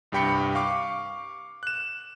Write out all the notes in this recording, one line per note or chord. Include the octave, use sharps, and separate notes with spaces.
C2 G2 G4 G5 B5 C#7
F5 C#6 D6
F#6 E7